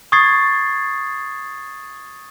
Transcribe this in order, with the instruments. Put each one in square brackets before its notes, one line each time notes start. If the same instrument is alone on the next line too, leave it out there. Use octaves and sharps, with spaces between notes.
[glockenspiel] C#6 D#6 G#6 A6 C7